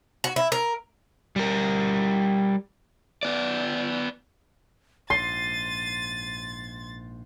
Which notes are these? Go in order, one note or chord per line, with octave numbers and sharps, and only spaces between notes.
F#4
E4
A#4
G3 A#4
B3 D5
A#1 G#2 C6 A6 D#7